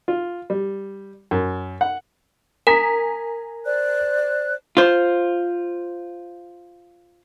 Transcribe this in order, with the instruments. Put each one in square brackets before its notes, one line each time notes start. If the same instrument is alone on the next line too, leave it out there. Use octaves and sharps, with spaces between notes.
[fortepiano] F4
G3
F#2
F#5
[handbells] A#4 [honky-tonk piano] G#5 A#5 B6
[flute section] C5 D5 F#6
[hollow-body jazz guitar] F4 C5